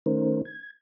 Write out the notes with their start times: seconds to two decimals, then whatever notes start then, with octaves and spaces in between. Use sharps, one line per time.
0.06 D#3 A3 C#4 D#4 A#4 C5
0.45 G#6